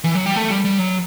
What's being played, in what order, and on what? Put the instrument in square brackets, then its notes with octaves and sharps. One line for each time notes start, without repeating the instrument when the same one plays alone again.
[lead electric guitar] E3
F#3
G3
A3
G3
G3
F#3